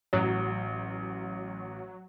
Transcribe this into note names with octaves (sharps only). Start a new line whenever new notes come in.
A1 F#3